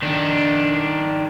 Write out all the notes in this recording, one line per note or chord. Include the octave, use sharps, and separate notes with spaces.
D#3 D4